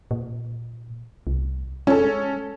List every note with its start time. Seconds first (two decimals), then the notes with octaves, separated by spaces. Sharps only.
0.11 A#2
1.27 C2
1.87 G#3 C#4 A4